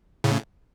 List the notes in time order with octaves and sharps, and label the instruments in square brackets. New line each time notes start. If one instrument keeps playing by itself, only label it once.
[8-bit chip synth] A2 C#3